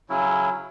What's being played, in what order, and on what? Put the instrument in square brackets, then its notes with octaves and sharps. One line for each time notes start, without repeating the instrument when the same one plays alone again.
[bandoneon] C#3 F#3 C#4 E4